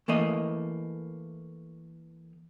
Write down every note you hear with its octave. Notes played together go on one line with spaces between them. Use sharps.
E3 A3 A#3 D#5